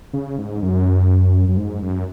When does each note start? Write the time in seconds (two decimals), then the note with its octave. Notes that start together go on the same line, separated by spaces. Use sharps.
0.13 C#3
0.38 G#2
0.62 F#2
1.49 F#2
1.57 G#2
1.82 F#2